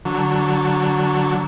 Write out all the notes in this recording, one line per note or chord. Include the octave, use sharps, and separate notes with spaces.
D3 F#3